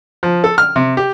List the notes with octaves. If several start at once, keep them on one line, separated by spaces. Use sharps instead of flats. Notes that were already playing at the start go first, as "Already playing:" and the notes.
F3
A4
F6
C3
G4